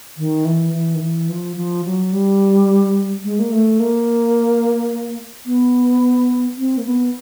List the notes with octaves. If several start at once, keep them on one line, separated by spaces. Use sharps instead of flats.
D#3
E3
E3
D#3
E3
F3
F3
F#3
G3
G#3
A#3
A3
A#3
B3
C4
A#3
B3